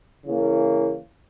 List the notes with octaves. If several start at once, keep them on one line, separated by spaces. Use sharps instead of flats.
C#3 E3 A#3